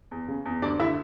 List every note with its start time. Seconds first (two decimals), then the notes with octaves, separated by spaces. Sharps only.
0.11 E2
0.28 C#3
0.45 E2
0.62 D2 D4 D5
0.79 D3 E4 E5